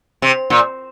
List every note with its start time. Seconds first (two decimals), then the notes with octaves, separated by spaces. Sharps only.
0.22 C3
0.50 A#2